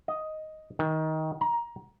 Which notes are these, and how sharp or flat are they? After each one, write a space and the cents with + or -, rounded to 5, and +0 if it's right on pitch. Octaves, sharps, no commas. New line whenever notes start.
D#5 +5
D#3 +20
A#5 +20